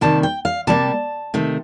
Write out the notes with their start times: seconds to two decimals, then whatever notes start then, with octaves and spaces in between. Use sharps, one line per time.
0.01 C3 D#3 G3 A#3 A5
0.23 G5
0.45 F5
0.67 C3 G3 A#3 A5
1.34 C3 D#3 A3